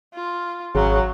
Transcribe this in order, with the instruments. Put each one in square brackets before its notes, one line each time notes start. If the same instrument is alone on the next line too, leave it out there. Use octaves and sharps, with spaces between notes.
[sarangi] F4
[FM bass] G#1 [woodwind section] C#3 [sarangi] F#3